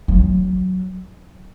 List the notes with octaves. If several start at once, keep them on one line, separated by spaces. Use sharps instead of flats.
F#3